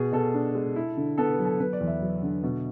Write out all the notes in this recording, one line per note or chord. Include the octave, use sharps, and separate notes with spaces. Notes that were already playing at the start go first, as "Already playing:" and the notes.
Already playing: B2 G#4
B2 A4
D4
G#3
E4
D3
B3 A4
B4
F#3
A4
B3 B4
D5
E2
E5
F#3
D3
B2